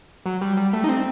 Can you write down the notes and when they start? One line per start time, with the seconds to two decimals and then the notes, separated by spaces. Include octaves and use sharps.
0.26 F#3
0.41 G3
0.57 G3
0.73 A3
0.84 D#4
0.89 C4